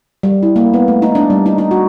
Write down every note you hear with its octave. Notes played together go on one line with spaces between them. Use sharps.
G3
E4
A#3
B3
A3
D#4
D4
G3
D#4
D#4
F#4